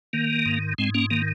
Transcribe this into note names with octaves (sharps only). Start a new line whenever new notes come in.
D#3 A#3
G#2
G#2 G#3 C4
A#3 C#4
D#3 A#3